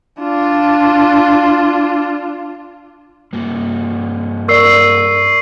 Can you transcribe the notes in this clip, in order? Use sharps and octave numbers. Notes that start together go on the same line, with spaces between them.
D4 F4
G2 A#3
A#4 D5 C#6 E6 C7